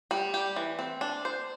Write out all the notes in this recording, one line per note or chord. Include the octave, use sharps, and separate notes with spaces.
G3
G4
E3
C4
D4
C5